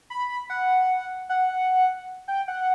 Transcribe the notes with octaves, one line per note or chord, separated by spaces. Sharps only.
B5
F#5
F#5
G5
F#5